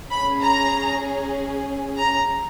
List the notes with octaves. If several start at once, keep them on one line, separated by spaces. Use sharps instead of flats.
C#4 G#4 B5
A#5
A#5